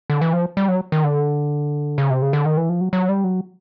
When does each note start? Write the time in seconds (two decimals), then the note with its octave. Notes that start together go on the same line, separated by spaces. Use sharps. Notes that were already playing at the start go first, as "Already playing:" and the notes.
0.10 D3
0.22 E3
0.33 F3
0.57 G3
0.68 F#3
0.92 D#3
1.04 D3
1.98 C#3
2.10 C3
2.22 C#3
2.33 D3
2.45 D#3
2.57 E3
2.69 F3
2.81 F#3
2.93 F#3
3.09 G3
3.24 F#3